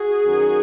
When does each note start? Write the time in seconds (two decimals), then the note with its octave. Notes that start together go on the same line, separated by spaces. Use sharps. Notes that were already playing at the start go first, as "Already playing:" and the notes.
Already playing: F#4 G#4
0.24 F#2 D#3